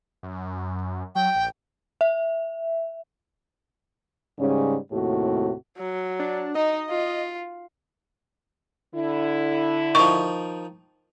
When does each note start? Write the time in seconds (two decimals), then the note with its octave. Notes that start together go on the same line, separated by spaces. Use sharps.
0.23 F#2
1.15 F#3 G5
1.35 A#1
2.01 E5
4.39 G#2 C#3 G3 C#4
4.92 D#2 A2 C3 F#4
5.78 F#3
6.19 D4
6.55 D#4 D#5
6.90 F4
8.95 D3 E4
9.95 D#3 F3 C#6